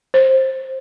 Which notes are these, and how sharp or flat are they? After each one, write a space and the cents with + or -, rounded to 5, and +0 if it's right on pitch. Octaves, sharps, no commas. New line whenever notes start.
C5 +15